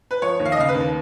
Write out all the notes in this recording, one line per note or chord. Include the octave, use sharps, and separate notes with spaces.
B4
F3 C#5
D#2
F5
D#5
C#3 F5
B4
D#2